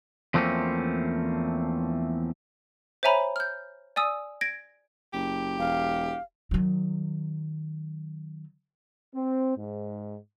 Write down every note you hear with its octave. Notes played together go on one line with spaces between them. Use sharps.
E2 F3 A3 A#3 C4 C#4
C5 C#5 E5 G#5 A#5 B5
F6 G6
D5 G#5 D#6 E6
G#6 A#6 D7
F#1 G4
E1 F5
D#3 F#3
C4
G#2